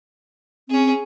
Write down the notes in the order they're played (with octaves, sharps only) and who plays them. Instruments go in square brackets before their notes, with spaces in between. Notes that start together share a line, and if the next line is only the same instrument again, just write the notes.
[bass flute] C4 [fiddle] C#4 G#4